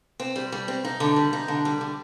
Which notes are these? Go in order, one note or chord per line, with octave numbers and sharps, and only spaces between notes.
C4
G3
G3
C4
D#4
D3
G3
D#4
D3
G3
D3